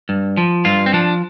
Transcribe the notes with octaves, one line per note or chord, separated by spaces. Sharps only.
G2
F3
G2 F4
C4
F3 D4